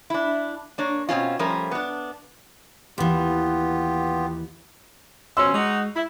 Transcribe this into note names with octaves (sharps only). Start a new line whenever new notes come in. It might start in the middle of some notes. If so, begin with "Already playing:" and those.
D4 E4
A#3 D4 C#5
B2 C4 C#4 F4
F3 G3 A3 C#4 A#4
B3 D4
D#2 E3 B3 F4 G4
B2 F3 C#4 C6 E6
G#3 D#4 F#4
E4